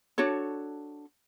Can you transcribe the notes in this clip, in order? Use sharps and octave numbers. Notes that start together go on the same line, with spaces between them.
D4 F#4 A4 C#5